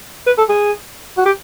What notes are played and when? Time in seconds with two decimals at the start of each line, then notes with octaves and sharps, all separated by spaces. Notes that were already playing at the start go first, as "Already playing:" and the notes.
0.27 B4
0.38 A4
0.49 G#4
1.17 F#4
1.26 G4